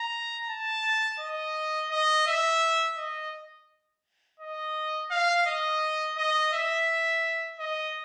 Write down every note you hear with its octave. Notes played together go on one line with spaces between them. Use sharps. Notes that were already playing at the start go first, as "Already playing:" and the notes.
Already playing: A#5
A5
D#5
D#5
E5
D#5
D#5
F5
D#5
D#5
E5
D#5